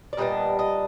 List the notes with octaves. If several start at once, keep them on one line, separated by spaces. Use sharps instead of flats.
D5
A#2 G3 B3 D4 D#5
D#5